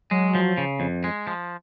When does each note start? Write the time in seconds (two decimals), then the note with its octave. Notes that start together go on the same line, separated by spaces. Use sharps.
0.11 F#3 G#3
0.35 F3
0.58 C#3
0.80 F2
1.04 G#3
1.27 F3